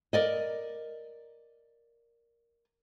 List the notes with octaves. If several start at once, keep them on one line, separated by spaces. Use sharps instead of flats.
A#4 D5 D#5